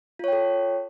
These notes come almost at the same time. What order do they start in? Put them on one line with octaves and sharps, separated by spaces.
F4 C#5 G5 A4